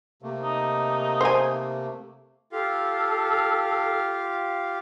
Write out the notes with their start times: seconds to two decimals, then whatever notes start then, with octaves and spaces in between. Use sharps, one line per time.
0.22 C3 A3 A#3
0.44 D#4
1.21 C5 G#5
2.52 F4 G4 A4 F5